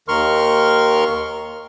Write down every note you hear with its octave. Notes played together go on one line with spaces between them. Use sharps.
D#2 D#3 A#4 C6 C#6 F6